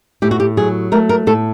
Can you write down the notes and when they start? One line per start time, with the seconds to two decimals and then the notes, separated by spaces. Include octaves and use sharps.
0.22 A2 G4
0.31 F#4
0.40 G4
0.57 F#3 G#4
0.92 A3 A#4
1.09 A#4
1.27 A2 A4